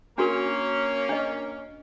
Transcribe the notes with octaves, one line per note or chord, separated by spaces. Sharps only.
A#3 C#4 D4 F#4 A#4
D4 D#5